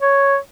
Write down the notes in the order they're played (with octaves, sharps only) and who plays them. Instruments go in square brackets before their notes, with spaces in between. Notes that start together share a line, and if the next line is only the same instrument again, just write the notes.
[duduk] C#5